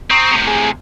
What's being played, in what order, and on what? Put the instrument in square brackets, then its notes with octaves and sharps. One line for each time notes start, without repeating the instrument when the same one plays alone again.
[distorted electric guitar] C4 [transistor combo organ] A#5 C#6 D#6
[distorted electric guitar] A2 C3
[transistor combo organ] G#4